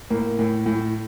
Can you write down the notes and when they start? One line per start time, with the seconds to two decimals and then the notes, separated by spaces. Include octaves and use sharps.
0.10 A2 A#3
0.39 A2
0.66 A2